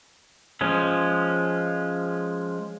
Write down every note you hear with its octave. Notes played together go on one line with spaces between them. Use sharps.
F3 G#3 C#4